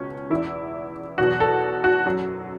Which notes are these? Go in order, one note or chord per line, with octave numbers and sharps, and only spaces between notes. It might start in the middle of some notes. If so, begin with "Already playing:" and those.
Already playing: C#2 B2 C#4
E2 E3 E4
E2 B2 F#3 F#4
A4
F#4
F#2 F#3